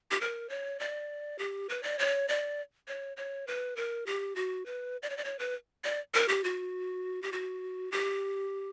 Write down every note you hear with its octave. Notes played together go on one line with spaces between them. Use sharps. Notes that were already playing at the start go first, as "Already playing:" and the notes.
G4
A#4
C#5
D5
G4
B4
D5
C#5
D5
C#5
C#5
B4
A#4
G4
F#4
B4
D5
C#5
D5
C#5
B4
D5
A#4
G4
F#4
G4
F#4
G4